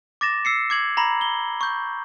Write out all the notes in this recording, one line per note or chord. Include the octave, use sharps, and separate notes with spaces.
D6 A6 A#6 E7
E6 C7 C#7
D6 G#6 F#7
A#5 B5 A#6 F#7
G7
C#6 G6